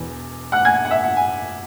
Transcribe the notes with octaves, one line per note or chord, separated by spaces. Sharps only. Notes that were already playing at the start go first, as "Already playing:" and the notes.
Already playing: E1 E2 E3
F#5 F#6
G#5 G#6
F#5
E5
F#5
G#5